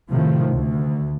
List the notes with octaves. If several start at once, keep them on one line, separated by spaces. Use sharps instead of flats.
A2 C3 D#3 F3
D2